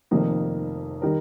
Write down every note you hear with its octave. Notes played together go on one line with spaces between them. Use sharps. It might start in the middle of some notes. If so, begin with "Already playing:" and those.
F1 F2 D#3 A#3
D#3 G3 A#4